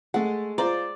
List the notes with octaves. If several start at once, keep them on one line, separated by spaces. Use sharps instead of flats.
G#3 A3 F#5
F4 C5 D5 A#5